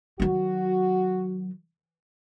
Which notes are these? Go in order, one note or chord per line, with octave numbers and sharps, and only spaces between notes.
D#3 F#3 F#4